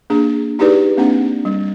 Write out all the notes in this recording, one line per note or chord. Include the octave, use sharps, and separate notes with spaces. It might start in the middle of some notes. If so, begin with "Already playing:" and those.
A#3 D4 G#4
D#4 E4 G4 G#4 B4 D5
A#3 C4 D4 F#5
G3